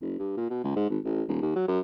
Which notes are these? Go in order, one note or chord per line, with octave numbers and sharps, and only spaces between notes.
F#1
G2
A#2
B2
C#2
G#2
G#1
A1
D#1
D#2
F#3
F#2